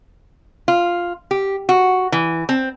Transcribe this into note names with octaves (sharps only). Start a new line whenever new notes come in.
F4
G4
F#4
E3
C4